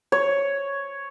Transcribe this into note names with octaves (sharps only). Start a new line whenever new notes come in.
C#5